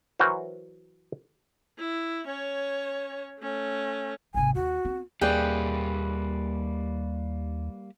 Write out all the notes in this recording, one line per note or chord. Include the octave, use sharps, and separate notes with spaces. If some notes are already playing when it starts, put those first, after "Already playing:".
E3 F#3 F#4 A#4 C5
E4
C#4 C#5
A3 C#4
G#1 C3 G#5
D#2 F#4
C4
D#2 G3 A#3 G#4 B4 D5 G5